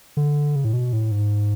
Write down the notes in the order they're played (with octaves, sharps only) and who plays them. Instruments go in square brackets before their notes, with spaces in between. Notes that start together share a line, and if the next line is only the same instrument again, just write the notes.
[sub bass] D3
C#3
A2
B2
A2
G#2